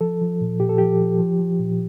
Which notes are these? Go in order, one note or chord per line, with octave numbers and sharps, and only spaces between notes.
F3 A4
F3
A#2
A#2 G4
A4
F3 G4
F3
F3
F3
A#2